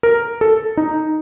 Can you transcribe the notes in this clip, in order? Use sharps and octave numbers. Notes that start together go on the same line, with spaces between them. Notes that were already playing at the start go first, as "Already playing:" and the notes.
A#4
A4
D#4